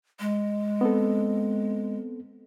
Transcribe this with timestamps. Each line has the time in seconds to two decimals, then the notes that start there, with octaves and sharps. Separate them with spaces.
0.20 G#3
0.81 B3 C4 A4